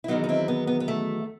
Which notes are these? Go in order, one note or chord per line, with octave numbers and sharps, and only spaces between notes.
E4
E2 D#3 F#3 B3 D#4
D#4
C4 E4
B3
B3
B3
A3